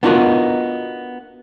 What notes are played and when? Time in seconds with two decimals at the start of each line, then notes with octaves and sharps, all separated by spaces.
0.03 B3 D4 D#4 F4 F#4 A#4